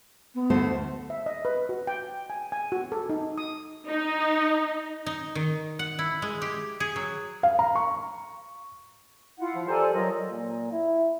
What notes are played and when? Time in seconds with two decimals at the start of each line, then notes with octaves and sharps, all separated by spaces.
0.34 B3
0.50 D2 A3 C5
1.10 E5
1.26 D#5
1.45 B4
1.69 F#4
1.87 G5
2.30 G#5
2.52 G#5
2.72 F#4
2.92 A4
3.10 D#4
3.38 D#6
3.87 D#4
5.06 D#4
5.35 D#3
5.79 F#5
5.99 E4
6.22 G#3
6.42 G4
6.80 G#4
6.96 F#3
7.43 F5
7.59 A#5
7.75 C#6
9.39 E4 F4 F#5
9.55 F3
9.68 G4 A4 A#4 C5 D5 G#5
9.93 F#3 F4 A#4 D#5
10.30 A#2
10.72 E4